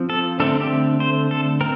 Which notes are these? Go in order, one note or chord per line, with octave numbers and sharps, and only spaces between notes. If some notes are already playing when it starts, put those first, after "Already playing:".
Already playing: F3 C4
A4
D3 A3 C4 A4
G4
C5
A4
C4 A#4